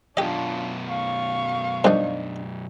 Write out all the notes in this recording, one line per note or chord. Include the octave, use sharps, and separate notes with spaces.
F#2 B2 D4 F4 G4 D#5
F5 C#6
G2 D#3 F3 D4 D#4